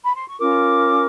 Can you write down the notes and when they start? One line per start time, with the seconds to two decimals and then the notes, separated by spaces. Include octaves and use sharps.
0.04 B5
0.15 C6
0.26 C#6
0.39 C#4 F4 A#4 D6